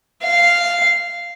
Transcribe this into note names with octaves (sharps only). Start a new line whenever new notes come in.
F5